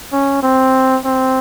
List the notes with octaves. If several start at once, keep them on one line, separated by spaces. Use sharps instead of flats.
C#4
C4
C4